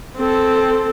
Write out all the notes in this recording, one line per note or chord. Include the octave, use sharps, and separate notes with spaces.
C4 A4